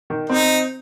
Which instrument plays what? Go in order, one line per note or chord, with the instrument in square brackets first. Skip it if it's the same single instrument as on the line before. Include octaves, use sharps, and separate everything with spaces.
[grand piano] D#3
[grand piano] C4 [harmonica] D#4